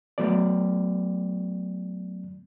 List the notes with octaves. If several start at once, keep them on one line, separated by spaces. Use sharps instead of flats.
F#3 A3 B3 D5